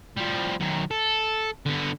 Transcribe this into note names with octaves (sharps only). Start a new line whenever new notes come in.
F3 G3
F#2 D#3
A4
D3 B3